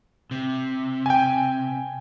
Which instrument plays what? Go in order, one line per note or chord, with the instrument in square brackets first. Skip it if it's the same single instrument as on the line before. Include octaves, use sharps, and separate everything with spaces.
[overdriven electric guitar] C3
[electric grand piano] G5 G#5